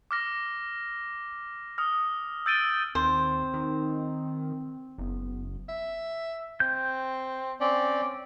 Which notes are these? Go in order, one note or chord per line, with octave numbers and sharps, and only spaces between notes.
D6 F6 A#6
D#6 F6
E6 G6 A6 D7 D#7 G7
D#2 C4 C5
D#3
F#1 B3
E5
C4 G6
C4 C#4 D5